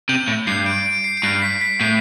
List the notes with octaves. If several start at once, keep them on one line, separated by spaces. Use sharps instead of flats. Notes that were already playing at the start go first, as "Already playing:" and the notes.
C3 G6
A2
G2 C7
D7
D7
C7
D7
G2 C7
B6
B6
A2 C7